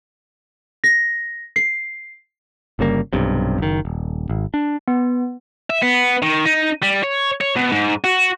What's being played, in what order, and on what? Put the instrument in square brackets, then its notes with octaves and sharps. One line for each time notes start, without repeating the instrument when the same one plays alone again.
[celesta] A#6
C7
[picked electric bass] G1 C#3 G3 A#3
B1 G2 C3
F#1 D#3
D#1
G#1
D4
[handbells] B3
[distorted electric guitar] E5
B3
D#3
D#4
G3
C#5
C#5
B2
G#2
F#4